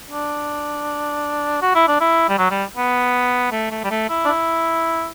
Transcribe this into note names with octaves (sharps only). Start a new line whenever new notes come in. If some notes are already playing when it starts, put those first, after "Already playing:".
D4
F#4
E4
D4
E4
G3
F#3
G3
B3
A3
A3
G3
A3
E4
D4
E4